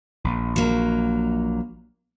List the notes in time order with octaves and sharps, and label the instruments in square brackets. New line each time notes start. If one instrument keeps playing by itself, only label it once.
[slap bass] A#1
[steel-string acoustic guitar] F#3 A#3